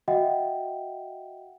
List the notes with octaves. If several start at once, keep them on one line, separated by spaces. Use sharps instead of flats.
F#4 D#5 E5 F#5 G5